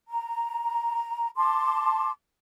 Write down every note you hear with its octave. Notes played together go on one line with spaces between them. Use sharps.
A#5
A5 C6 D6